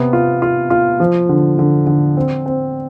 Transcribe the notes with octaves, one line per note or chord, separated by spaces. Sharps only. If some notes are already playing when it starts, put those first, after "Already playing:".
Already playing: C3 B3
F4
F4
F4
F3
D3
D3
D3
C4
C4